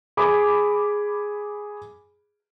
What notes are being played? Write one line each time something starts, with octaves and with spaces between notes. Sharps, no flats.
G#4 B5 D6